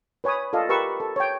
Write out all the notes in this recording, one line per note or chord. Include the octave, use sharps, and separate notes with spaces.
B4 C#5 G#5 B5 D#6
F4 A4 D5 D#5 F5
G4 A#4 B4 C#6 E6
A4
C#5 G5